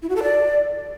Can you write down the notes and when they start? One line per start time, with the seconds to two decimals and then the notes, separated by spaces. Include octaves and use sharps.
0.02 E4
0.09 F#4
0.16 A4
0.23 D5